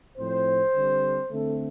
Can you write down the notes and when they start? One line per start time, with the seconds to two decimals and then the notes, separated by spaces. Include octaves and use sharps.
0.18 A2 F3 C4 C5
0.75 D3 G3 C4
1.30 D3 A3 C4 A4